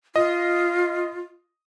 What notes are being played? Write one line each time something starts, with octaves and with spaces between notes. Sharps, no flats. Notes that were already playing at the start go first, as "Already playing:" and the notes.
F4 D#5